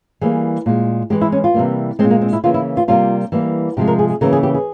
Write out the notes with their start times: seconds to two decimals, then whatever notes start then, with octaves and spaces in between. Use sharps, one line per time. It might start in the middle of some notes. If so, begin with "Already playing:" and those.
0.21 E3 G3 A#3 G#4
0.66 A#2 G#3
1.10 E3 G#3 G4
1.21 E4
1.32 C#4
1.44 F4
1.54 C3 E3 G3 A#3
1.99 G#3 C4
2.04 A#2
2.10 A#3
2.21 C4
2.33 E4
2.44 C#3 E3 A#3 F4
2.54 E4
2.77 F4
2.88 C3 G3 A#3 F4
3.32 E3 G3 A#3
3.77 C3 F3 G#3 G4
3.88 A#4
3.99 G#4
4.10 G#4
4.21 C#3 E3 A#3 A#4
4.33 G#4
4.43 G4
4.54 G#4